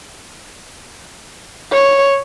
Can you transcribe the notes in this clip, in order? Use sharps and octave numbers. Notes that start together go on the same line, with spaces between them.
C#5